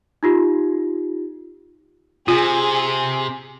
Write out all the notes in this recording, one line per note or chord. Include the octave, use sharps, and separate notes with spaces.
D#4 F4 G4
C3 F4 G#4